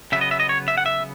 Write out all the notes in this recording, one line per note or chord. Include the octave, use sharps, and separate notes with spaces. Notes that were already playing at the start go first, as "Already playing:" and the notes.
C#3 F#3 B3 E5
D#5
E5
D#5
C#5
E5
F#5
E5